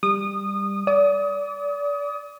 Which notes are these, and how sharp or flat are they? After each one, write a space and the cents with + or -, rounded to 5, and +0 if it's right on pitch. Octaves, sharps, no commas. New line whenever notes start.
G3 +15 D#6 -25
D5 -30 D#6 +25